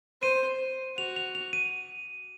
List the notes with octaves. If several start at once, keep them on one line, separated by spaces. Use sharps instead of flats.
C5 D#7
F#4 F7
F7
F7
D#7